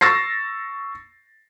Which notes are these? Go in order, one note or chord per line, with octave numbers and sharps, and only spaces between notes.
C#6 E6 A6 A#6 C7